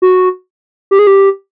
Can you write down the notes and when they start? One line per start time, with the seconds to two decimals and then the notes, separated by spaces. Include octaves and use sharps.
0.02 F#4
0.91 G4
0.99 G#4
1.07 G4